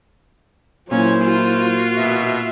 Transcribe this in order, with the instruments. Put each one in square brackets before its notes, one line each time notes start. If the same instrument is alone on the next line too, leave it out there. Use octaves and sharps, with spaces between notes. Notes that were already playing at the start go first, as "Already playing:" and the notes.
[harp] A#2 [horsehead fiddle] F#3 E4 [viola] C#4 [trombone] C5
[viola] F4 F#4
[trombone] B2 [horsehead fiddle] E5